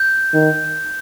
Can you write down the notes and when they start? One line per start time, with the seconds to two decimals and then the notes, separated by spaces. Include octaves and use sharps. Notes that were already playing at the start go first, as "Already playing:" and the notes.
Already playing: G6
0.34 D#3